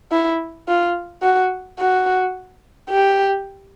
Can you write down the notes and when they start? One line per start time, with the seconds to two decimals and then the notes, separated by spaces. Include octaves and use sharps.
0.12 E4
0.68 F4
1.22 F#4
1.79 F#4
2.90 G4